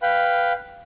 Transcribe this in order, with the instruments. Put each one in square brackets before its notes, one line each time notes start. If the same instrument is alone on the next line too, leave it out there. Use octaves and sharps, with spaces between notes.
[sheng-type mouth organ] B4 F5 G5 B5